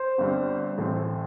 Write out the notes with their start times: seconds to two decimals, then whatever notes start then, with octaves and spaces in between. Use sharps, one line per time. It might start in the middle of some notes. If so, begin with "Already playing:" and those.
Already playing: C5
0.18 G1 G2 G3 C4
0.78 A1 A2 A3 C4